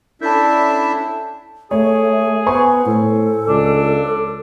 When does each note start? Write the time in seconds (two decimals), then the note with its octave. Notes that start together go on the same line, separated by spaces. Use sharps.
0.22 C#4 D4 E4 A4 E5 A5 G6
1.71 A3 G#4 C#5
2.46 B3 C5 G#5 C#6
2.86 A2 A4
3.48 C#2 D4